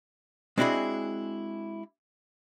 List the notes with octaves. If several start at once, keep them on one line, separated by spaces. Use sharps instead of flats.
G#3 C4 D4 E4 F#4 G#4